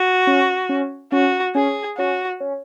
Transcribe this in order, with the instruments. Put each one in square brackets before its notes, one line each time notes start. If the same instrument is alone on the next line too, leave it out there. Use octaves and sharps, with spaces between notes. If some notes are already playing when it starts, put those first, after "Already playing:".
Already playing: [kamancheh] F#4
[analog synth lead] C#4
C#4
[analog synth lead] C#4 [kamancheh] F#4
[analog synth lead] C#4 [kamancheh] G#4
[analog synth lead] C#4 [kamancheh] F#4
[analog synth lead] C#4